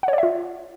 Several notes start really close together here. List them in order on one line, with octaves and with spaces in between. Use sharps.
F#5 C#5 D5 E5 F4